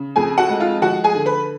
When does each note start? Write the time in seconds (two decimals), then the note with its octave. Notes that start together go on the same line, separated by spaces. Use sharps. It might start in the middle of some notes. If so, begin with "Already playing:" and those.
Already playing: C#3
0.16 F2 G#4 G#5
0.38 F#4 F#5
0.49 G#3
0.60 F4 F5
0.82 F3 F#4 F#5
1.04 G#4 G#5
1.15 D3
1.26 B4 B5